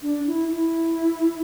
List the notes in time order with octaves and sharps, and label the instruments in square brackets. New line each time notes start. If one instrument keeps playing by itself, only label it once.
[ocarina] D4
E4
E4